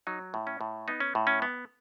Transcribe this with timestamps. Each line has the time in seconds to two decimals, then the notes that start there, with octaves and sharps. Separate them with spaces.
0.07 F#3 D#4
0.34 A2
0.47 C#4
0.61 A2
0.88 B3 D#4
1.00 C#4
1.15 A2
1.27 C#4
1.42 B3